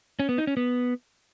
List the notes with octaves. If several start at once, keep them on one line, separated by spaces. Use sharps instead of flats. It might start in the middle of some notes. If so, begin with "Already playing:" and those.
C#4
B3
D#4
C#4
B3